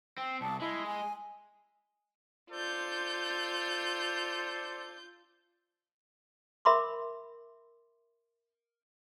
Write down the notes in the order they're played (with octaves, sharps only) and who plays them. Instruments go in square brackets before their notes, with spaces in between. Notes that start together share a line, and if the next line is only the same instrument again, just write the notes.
[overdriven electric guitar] C4 [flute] G5
[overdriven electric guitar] C2 [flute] A5
[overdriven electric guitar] G#3 [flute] E4
[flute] G#5
[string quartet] F4 G6 [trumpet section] A4 C5 D5
[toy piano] A#4 E5 B5 C6 D6